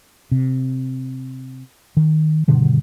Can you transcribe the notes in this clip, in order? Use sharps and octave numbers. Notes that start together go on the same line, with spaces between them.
C3
D#3
G2 B2 D3 D#3